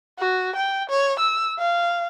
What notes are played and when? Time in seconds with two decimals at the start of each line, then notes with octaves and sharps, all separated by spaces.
0.19 F#4
0.56 G5
0.90 C#5
1.19 E6
1.58 F5